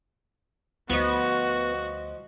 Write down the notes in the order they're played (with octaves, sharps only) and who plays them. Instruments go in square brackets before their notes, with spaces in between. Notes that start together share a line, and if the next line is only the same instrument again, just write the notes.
[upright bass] D2 [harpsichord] F3 D#4 [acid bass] B3 [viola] F#4